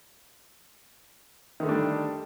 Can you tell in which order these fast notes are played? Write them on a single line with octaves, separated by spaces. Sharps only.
D#3 D3 A3 D4 G3